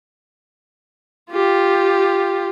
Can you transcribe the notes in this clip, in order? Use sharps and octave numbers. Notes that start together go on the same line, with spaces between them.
F4 G4